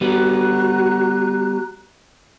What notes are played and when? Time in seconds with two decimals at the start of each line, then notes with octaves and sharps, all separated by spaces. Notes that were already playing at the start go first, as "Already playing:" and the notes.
0.01 G3 B3 F#4 A#5 F#6